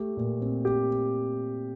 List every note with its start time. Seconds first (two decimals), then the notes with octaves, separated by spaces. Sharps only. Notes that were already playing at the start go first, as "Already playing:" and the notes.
Already playing: A3 G4
0.17 A#2
0.41 C4
0.65 G4